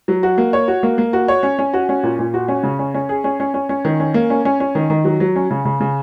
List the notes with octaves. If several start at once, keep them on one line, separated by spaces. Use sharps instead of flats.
F#3
F#4
A#3
C#5
F#4
A#3
A#3
F#4
C#5
C#4
C#4
F#4
C#4
A#2
A#2
F#4
C#4
C#3
C#4
C#4
G#4
C#4
C#4
C#4
C#4
D#3
C#4
A#3
C#4
C#4
C#4
D#3
D#3
F#3
F#3
C#4
C#3
C#3
C#3